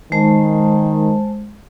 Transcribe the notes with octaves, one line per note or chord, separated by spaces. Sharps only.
D#3 G#3 C5 A5